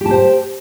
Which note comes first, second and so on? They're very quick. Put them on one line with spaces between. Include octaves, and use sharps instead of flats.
G4 A5 C5